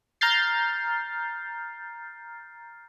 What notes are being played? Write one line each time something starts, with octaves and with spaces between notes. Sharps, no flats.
A#5 F6 G6 A6 C7